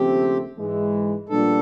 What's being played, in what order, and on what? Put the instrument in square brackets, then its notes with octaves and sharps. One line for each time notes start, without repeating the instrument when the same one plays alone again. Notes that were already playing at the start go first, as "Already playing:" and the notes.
Already playing: [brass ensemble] D#2 C#3 F3 A3 C4 [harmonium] G4
[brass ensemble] G#2 E3 G#3
[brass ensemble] A#1 A#2 G3 B3 D4 [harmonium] A4